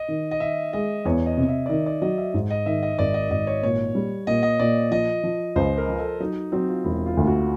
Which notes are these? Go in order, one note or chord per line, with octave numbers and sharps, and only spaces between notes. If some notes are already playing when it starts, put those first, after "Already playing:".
Already playing: D#5
D#3
D#5
D#3 E5
G#3 D#5
E2 C#5
D#5
C3
E5
D5
D#3 D#5
D5
F#3 D#5
E5
G#2
D#5
D#3 E5
D#5
G#1 D5
D#5
G#1 D#5
C#5
A#2 C#5
G3
A#2 D#5
D#5
A#2 D5
F3 D#5
F3
C#2 C5
A#4
F3
A4
F#3 D#4
F#3 C4
F4
E1 E4
F4
D2
F#4